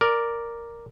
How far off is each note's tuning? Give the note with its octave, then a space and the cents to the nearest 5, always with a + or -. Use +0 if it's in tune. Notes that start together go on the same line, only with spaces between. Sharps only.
A#4 +0 D5 +0